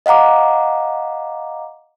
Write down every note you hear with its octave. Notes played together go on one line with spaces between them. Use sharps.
D#5 F5 F#5 A#5 D6